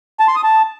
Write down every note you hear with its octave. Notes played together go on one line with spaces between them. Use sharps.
A5
C6
D#6
A5